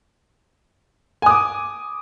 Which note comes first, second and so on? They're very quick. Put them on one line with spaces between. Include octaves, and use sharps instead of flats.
G#5 D#6 D6